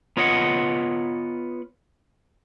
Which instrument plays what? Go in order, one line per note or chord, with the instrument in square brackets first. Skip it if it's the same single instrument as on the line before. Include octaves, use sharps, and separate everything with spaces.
[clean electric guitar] B3 F4 C#5 D#5 E5 F#5